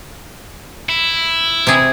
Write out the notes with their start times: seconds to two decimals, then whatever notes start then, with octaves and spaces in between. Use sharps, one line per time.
0.89 E4
1.67 C3 G#4